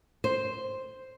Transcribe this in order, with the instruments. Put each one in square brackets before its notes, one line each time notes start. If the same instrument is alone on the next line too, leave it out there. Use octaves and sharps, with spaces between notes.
[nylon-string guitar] C5